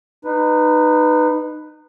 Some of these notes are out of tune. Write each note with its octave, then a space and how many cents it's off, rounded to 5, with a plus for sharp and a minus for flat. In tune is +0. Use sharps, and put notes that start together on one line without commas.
D#4 -25 B4 +0